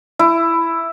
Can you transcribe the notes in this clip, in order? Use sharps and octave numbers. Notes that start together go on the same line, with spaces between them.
E4